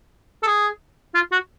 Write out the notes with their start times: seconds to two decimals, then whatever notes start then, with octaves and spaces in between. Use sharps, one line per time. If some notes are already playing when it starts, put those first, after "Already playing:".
0.43 A4
0.47 G#4
1.15 F4
1.32 F#4